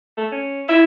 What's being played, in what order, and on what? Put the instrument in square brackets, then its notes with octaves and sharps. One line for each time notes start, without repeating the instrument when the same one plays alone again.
[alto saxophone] A3
C#4
[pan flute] E4 [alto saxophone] E5